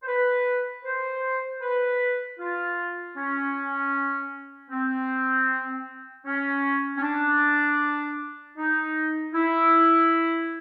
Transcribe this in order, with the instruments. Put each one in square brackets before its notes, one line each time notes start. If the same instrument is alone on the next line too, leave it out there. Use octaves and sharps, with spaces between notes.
[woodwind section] C5
B4
C5
B4
F4
C#4
C4
C#4
C#4
D4
D#4
E4